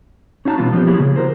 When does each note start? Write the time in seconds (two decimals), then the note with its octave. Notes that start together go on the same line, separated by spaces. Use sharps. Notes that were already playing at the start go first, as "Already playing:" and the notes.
0.45 C#4 D#4 F#4 E5 A5 A#5
0.58 B2 E3 G3 B3 F4
0.72 F3 B3 C#4 E4 G4
0.86 F3 F#3 A#3 E4 G4 G#4
1.00 C#3
1.16 F#4 A#4 C5